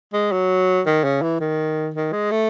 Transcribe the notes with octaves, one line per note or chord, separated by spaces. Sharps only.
G#3
F#3
D#3
C#3
E3
D#3
D#3
G#3
A3